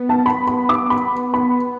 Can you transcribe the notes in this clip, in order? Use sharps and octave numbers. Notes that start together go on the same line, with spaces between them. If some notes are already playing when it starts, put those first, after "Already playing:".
Already playing: B3
A5
B5
B5
D6
B5
B5